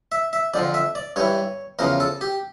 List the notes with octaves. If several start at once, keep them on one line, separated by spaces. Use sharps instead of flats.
E5
E5
F2 D3 F3 D5
E5
D5
G2 E3 C#5
E2 C#3 F3 A#4
A4
G4